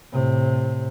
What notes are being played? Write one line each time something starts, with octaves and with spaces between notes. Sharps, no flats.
A2 C3